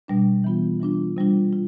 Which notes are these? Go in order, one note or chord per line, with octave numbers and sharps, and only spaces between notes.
B2 G3 D4
E3 B3 F4
E3 G3 D4 F4
C3 G3 D4 F4
F4